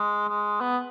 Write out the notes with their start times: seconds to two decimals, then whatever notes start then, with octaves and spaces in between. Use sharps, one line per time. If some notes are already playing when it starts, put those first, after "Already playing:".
Already playing: G#3
0.29 G#3
0.61 B3